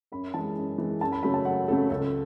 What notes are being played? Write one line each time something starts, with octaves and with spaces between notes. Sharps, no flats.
F#2 B5
E3 G#3 A5
F#2
E3 G#3
F#2 A5
B5
C#3 F#3 A3 B5
A5
F#2 F#5
C#3 F#3 A3 A4
C#2 A4